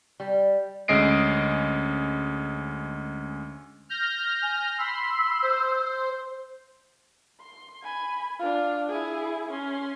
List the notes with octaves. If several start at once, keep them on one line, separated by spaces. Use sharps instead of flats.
G3
D2 G#3 C#4 D#5 C7 D7
F6 G6 A#6
G#5
B5 C6 E6
C5
C6
G#5 B5
D4 F4
E4 G#4
C#4 C6